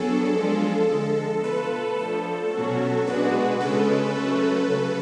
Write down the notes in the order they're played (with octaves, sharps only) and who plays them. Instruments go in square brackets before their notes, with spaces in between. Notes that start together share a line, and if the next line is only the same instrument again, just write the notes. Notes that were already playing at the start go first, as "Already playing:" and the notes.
Already playing: [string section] F#3 B3 D4 G#4 [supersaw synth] A4
[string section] F3 G#3 D4 F4 G#4
D3 F3 G#3
[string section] B2 A3 F4 [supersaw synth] B4
[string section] F3 A3 D4 [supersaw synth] A4
[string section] B2 F#3 C#4 F#4
[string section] B2 G#3 D4 F#4 [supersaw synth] B4
[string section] C#3 G#3 C#4 [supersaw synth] A4
[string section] F#3 A3 C#4 F#4
C#3 F#3 C#4